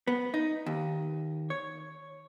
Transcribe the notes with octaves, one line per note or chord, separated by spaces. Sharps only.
B3
D#4
D#2
C#5